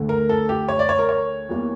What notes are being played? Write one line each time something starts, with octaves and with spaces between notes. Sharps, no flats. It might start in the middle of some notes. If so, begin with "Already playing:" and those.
Already playing: D2 D3 A3
A#4
A4
G4
C#5
D5
C#5
A#4
C#5
E2 E3 G3 A#3